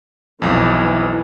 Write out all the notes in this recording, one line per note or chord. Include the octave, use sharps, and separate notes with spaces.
B1 F2 E3